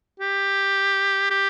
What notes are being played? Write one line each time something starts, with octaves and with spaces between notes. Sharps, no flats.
G4
G4